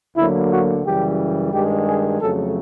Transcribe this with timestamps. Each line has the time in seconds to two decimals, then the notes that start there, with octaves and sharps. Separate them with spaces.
0.16 D2 D3 F#3 A#3 E4
0.51 F#4
0.84 F#2 C#3 E3 G3 G4
1.52 G2 D#3 G#3 G4
1.87 G#4
2.21 F2 C#3 F#3 A3 A4